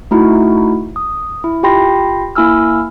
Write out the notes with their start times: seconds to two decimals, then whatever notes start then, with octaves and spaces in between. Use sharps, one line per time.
0.11 A3 D#4 E4 F#4
0.96 D#6
1.44 E4
1.63 F4 G4 G5 B5 C6 A#6
2.35 A#3 E4 G#5 E6 F6